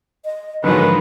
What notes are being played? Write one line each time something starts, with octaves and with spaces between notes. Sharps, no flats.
D#5
G#2 D3 D#3 F3 F#3 G#3 B4